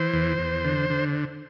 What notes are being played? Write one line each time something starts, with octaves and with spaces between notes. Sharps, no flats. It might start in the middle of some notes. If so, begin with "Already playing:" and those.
Already playing: E3 C5
E2
E2
D3
D3